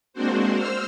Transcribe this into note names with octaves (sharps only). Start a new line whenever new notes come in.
G#3 A#3 C4 D4 F#4 C5
C5 E6 F6